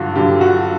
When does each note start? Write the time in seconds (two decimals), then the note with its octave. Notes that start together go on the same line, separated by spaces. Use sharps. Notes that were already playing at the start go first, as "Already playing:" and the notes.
Already playing: G2 D3 F#3 F4 F#4
0.15 G2 D3 F#3 G4
0.41 F#4